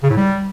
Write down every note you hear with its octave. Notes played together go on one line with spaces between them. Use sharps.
C#3
A2
G3